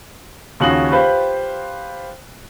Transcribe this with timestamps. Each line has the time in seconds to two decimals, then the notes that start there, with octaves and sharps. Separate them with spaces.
0.60 D#2 C#3 F3 F#4 G#4 F#7
0.91 F4 G4 B4 C5